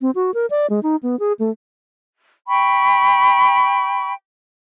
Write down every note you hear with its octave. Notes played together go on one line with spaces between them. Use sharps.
C4
F#4
A#4
D5
G#3
D#4
B3
G#4
A3
G5 B5 C#6